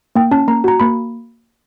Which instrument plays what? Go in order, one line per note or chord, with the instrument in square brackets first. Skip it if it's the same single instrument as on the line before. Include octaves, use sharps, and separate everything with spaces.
[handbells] A#3 G5
C#4 A5
A#3 A#5
F#4 A#5
A#3 B5